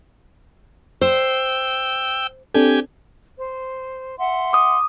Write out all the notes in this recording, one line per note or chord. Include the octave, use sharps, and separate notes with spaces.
C5 G5 E6
C4 D4 G4 A4 G#5
C5
E5 F#5 C6
D6 D#6